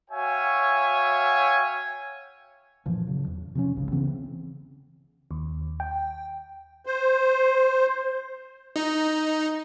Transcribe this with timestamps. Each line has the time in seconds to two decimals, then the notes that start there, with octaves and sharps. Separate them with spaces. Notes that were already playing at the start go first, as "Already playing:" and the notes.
0.11 F#4 C#5 E5 F5 G5 G#5
2.86 F#2 A#2 E3 F3
3.07 C#3 F#3
3.24 D#1 E2
3.55 C3 F3 A3 C#4
3.76 G#1 C#2 G#2 C#3
3.91 C#3 E3 B3 C4
5.31 D#2
5.80 G5
6.86 C5
8.76 D#4